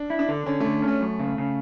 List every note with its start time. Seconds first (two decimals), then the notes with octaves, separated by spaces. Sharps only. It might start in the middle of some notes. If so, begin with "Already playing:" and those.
Already playing: D4
0.10 E4
0.19 D4
0.29 D3
0.46 D3 C#4
0.60 D3 A3
0.82 C#4
0.88 A3
1.01 F#2
1.19 C#3
1.38 C#3